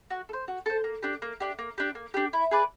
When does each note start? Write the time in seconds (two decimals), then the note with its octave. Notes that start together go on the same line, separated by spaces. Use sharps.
0.10 F#4
0.29 A4
0.33 C5
0.48 F#4
0.66 A4 C5
0.84 A#3
1.03 D4 G4
1.22 A#3
1.40 D4 G4
1.59 A#3
1.78 D4 G4
1.95 A#3
2.14 D4 G4
2.33 E4
2.51 G#4 B4 D5